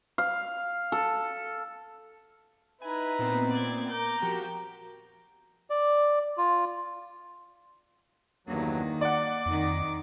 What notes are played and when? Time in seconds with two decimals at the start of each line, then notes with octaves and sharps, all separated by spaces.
0.18 F5
0.92 A4
2.82 D#4 E4 B4 G#5 A#5
3.19 A#2 B3 C4
3.51 D5 G#6
3.90 A#4 A#5 D6 G6
4.22 F3 F#4 G4 G5
5.70 D5
6.38 F4
8.47 E2 G2 D#3 F#3 A#3
9.01 D5 F#5 D6
9.46 F2 D#3 D#4